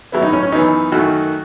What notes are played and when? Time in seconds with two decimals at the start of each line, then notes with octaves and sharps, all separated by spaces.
0.12 A2 F#3 B3 E4
0.22 D#4
0.33 C#4
0.43 C#4
0.52 F#2 E3 B3 D#4
0.92 F#2 D#3 A3 F#4